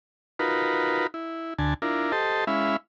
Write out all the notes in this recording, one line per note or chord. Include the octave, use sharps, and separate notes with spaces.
D#4 F4 F#4 A#4 B4
E4
D2 D3 G#5 A5
D4 E4 F4 A#4
G4 A4 C5 D#5 A5
G#3 C#4 E4 E5 F5 B5